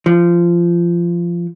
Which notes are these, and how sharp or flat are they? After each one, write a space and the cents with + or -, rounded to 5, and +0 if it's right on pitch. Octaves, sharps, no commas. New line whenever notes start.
F3 -20